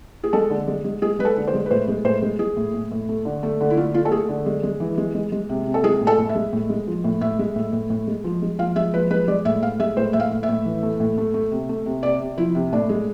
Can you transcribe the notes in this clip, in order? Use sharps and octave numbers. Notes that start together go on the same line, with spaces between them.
G#4
G#3 A4
D3
G#3
G#3
G#3 G#4
G#3 B4
A4
D3
C5
G#3
B4
A2 C5
G#3
A2 C5
G#3
G#3 G#4
A2
A2
A2
A3
D3
A3
D3
E4
A3 F4
A3 F4
A4
A3 G#4
D3
G#3
G#3
E3
G#3
G#3
G#3
C3
C3
A4
G#3 G#4
A2
A4
A2
E5
G#3
A2
G#3
F3
A2
A2 E5
G#3
A2
A2
A2
G#3
F3
G#3
F3 F5
G#3 E5
F3 B4
G#3 B4
G#3 D5
A2 E5
A2 F5
G#3 E5
A2 C5
A2 E5
F5
A2
E5
A2
E3
A3
A2
A3
A3
C3
A3
C3
C3 D5
C3
F3 E4
C3
A2 D4
G#3